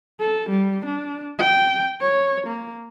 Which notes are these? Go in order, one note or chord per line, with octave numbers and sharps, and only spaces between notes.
A4
G3
D4
G5
C#5
A#3